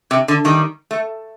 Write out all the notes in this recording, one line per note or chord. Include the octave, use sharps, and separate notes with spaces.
C3
D3
D#3 G3
A3